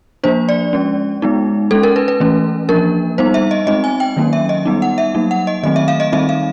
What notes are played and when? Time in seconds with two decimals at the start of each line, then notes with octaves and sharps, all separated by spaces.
0.24 F3 A#3 D4 C5
0.49 D5
0.73 G#3 C#4
1.22 G#3 B3 D#4
1.71 G#3 C#4 A4
1.83 A#4
1.96 B4
2.08 B4
2.20 E3 A3 C#4
2.69 F3 A#3 D4 A#4
3.18 G3 B3 D#4 C5
3.34 E5
3.51 D#5
3.67 G#3 C4 D#4 D#5
3.84 G#5
4.00 G5
4.17 D#3 F#3 A#3 C#4
4.33 E5
4.49 D#5
4.65 G3 B3 D#4
4.82 F#5
4.98 E5
5.15 F#3 A#3 D#4
5.31 F#5
5.47 D#5
5.63 D#3 F#3 A3 C4 D#5
5.76 E5
5.88 F5
6.00 D#5
6.12 D#3 G3 C4 D#4 E5
6.29 F5